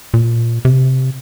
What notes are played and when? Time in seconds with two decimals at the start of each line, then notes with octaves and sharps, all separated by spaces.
0.14 A#2
0.65 C3